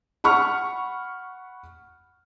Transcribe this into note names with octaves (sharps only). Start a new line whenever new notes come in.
F#5 B5 C#6 F6